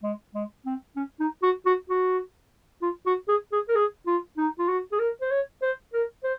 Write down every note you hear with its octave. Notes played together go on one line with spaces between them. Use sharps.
G#3
G#3
C4
C#4
D#4
F#4
F#4
F#4
F4
F#4
G#4
G#4
A#4
G#4
F4
D#4
F4
F#4
G#4
A#4
C5
C#5
C5
A#4
C5